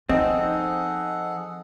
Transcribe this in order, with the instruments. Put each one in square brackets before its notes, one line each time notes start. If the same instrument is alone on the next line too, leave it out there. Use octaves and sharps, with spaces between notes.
[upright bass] F3 [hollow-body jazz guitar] C4 [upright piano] D#4 D#5 [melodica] G#4 A4 F#5